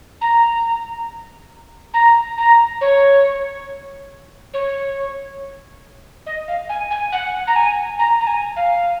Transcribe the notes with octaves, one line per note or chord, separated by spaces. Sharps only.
A#5
A#5
A#5
C#5
C#5
D#5
F5
G#5
G#5
F#5
A#5
G#5
A#5
A#5
G#5
F5